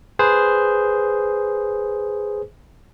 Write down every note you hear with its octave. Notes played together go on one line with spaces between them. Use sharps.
G#4 B4 C5